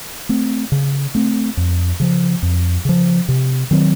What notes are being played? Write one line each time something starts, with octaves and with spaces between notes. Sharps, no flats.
A3 C4
C#3
A3 C4
F2
C#3 F3
F2
C#3 F3
C3
D#3 F#3 C4